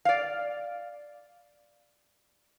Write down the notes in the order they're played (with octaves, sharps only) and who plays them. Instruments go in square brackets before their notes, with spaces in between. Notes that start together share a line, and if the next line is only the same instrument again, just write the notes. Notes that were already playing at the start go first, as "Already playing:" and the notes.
[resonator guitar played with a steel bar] D5 F5